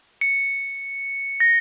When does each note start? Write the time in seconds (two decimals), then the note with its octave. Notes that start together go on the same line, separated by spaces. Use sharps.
0.21 C#7
1.40 A#6